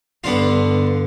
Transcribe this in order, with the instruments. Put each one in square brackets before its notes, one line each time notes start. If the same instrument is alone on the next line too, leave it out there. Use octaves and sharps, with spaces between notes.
[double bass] G2 D3 [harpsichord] B3 D4 F4